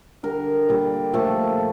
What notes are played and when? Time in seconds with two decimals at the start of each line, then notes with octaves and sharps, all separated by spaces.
0.23 D3 G3 A#4
0.69 A#2 G3
1.13 A#2 F3 A3 A4